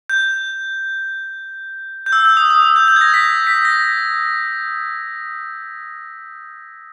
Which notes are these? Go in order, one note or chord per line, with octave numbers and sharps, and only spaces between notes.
G6
G6
E6
G6
D#6
D#6
D#6
G6
G6
G#6
A#6
B6
B6
A#6